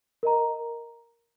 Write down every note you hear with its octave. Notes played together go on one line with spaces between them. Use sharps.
A#4 D#5 A#5